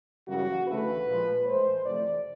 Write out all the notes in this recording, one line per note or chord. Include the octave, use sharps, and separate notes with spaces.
F#2 C#3 E3 G3 A#3 F#4
D2 C#3 E3 A3 B4
A#2 F3 G#3
A2 E3 G#3 C5
F2 C3 E3 A3 D5